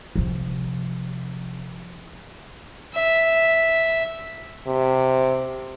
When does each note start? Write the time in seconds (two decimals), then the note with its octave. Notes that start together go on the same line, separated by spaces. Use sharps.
0.16 C3 F3
2.95 E5
4.67 C3